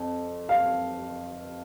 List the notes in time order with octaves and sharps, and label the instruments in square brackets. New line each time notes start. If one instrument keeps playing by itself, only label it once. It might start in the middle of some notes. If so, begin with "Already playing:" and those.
Already playing: [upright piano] F2
F5